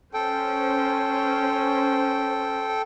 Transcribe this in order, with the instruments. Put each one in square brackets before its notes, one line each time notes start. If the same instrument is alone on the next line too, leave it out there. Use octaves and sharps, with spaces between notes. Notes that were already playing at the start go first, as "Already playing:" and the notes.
[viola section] C#4 C5 [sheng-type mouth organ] A4 G5